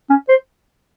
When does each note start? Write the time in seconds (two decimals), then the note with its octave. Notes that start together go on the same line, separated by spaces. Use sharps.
0.10 C#4
0.29 C5